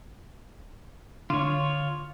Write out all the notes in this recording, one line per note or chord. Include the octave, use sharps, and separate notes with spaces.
D3 F4 C#5